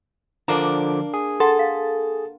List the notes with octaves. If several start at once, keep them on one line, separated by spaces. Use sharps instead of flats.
D3 F3 A#3 D4 A#5 D6
G#4
A4 F#5 C6
F5